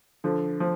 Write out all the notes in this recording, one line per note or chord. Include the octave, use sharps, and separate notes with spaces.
D3 F3
F3